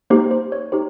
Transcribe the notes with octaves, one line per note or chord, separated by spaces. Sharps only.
A#3 D#4 G4 C5
C5
C#5
D#4 G4 C5